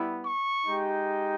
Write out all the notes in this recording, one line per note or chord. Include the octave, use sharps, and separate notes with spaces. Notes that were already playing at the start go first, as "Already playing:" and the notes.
Already playing: G3 B3 E4
C#6
G#3 D#4 G4